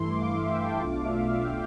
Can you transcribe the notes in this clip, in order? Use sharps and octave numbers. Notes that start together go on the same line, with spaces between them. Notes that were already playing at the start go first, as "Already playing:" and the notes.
Already playing: G2 E3 A3 E4 C6
D6
F5
E5
G5
A5
B1 B2 A3 D4 F4 D6
F5
E5
E5
F5
G5